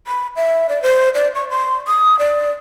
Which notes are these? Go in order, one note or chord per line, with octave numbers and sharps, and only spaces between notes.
B5
E5
D5
C5
D5
C#6
C6
D#6
D5